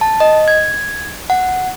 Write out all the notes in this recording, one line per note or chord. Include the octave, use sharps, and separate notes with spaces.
A5
D#5
G#6
F#5